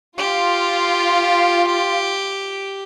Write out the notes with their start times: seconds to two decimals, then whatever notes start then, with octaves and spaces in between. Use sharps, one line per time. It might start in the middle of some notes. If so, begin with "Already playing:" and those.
0.18 F4 G4